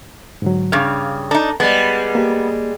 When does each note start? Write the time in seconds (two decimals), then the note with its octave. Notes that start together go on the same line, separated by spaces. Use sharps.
0.42 G#2 D3 F#3
0.72 G2 C#3 F5 D6 F6
1.31 D4 D#4 A4 A5 A#5
1.60 G3 G#3 B3 A6
2.15 A#3 G4